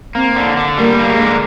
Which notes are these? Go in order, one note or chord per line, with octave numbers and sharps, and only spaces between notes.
A#3 C4
D3
D3
G3 A#3
A#3
G#3
D3